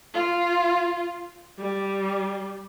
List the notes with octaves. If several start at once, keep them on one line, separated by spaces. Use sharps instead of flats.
F4
G3